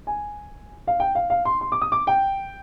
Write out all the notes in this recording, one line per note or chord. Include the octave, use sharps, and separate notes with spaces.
G#5
F5
G5
F5
F5
C6
C6
D6
D#6
D6
G5